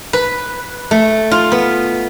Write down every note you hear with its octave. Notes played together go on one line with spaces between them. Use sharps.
B4
A3
F4
B3